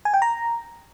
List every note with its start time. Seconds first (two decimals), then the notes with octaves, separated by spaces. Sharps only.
0.05 G#5
0.14 G5
0.22 A#5